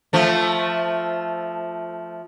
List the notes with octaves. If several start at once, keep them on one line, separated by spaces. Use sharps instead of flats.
F3 A3